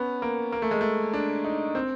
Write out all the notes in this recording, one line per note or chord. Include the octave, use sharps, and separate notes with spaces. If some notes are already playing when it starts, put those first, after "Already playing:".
Already playing: B3 C#4
A#3
A#3
A3
G#3
A3
D4
D#4
C4